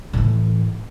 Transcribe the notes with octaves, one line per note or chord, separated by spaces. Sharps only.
A2 E3